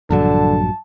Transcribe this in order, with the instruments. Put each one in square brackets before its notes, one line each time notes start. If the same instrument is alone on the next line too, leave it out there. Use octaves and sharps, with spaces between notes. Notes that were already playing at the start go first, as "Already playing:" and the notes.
[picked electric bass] A#1 G2 F#3 [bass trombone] D3 [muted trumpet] A5